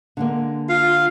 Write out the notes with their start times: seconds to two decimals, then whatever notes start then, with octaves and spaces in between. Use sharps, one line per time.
0.17 D3 G#3 A#3
0.69 F4 F5